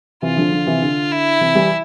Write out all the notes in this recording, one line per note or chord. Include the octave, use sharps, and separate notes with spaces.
C3 E3 F4
D3 F3
D3 F3
C3 E3
D3
E4
C3 E3
E3 G3